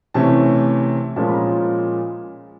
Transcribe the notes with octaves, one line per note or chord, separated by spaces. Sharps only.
C3 E3 A3 C#4 A5
A#2 F3 G#3 C#4 F4 A5
B5
A#5